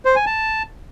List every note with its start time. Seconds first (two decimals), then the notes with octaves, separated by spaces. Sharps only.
0.05 C5
0.16 G#5
0.26 A5